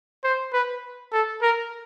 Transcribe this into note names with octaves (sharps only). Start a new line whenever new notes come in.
C5
B4
A4
A#4